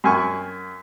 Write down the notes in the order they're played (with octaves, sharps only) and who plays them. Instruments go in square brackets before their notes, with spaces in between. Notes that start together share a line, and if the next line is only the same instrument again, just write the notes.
[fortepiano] F#2 G#5 C#6